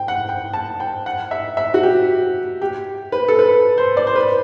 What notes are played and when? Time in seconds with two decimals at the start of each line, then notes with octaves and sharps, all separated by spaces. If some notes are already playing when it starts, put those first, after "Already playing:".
Already playing: G5
0.08 F#5
0.29 G5
0.54 A5
0.80 G5
1.06 F#5
1.31 E5
1.57 E5
1.74 F#4
1.83 G4
2.62 G4
3.12 B4
3.28 A4
3.39 B4
3.78 C5
3.97 D5
4.07 C5
4.16 B4